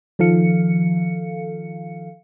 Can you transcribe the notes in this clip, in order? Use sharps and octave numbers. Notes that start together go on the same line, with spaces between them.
D#3 F3 A4 F5 C#7